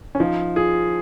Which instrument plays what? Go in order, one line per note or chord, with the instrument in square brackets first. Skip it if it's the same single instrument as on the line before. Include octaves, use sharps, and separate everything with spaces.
[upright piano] C#4
[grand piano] F3 [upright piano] D#4
[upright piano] F4 [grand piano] G#4